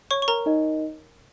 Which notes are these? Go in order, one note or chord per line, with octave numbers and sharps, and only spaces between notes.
C#5 C#6
C#6
A#4 A#5
D#4 A#4 D#5